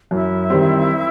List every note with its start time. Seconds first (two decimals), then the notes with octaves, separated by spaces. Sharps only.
0.11 F#2 E4 E5
0.50 D#3 G3 C4